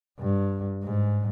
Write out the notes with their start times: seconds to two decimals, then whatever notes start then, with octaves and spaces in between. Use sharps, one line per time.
0.20 G2
0.84 G#2